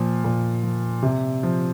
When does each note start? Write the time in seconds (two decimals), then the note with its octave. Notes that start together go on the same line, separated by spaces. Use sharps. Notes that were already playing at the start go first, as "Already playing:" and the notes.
Already playing: A#2 F3
0.24 A#2
0.63 F3
1.03 C3
1.43 F3